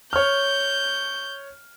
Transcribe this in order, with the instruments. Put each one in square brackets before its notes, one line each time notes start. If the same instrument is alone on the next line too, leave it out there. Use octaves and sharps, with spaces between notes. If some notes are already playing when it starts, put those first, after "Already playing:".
[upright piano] C#5 F6 [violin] G6